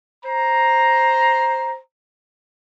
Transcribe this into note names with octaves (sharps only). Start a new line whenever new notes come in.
C5 A#5